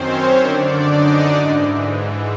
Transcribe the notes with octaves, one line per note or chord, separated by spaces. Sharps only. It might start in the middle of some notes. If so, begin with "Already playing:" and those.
Already playing: F#2 D#3 C4 C#4 C5 C#5
F#2 D3 D4 D5
D#4 D#5
G#2 E3